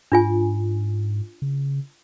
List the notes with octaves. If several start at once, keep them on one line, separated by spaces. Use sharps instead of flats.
G#2 D4 F4 G#5
C#3